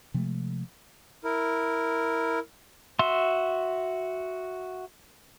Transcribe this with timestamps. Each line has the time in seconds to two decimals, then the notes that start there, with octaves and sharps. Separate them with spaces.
0.14 C3 F3 G#3 A3
1.24 E4 A#4
2.99 F#4 E5 C6